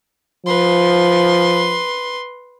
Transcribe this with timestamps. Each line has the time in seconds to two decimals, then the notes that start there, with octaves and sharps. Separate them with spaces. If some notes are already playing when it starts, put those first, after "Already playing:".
0.46 F3 B4 C6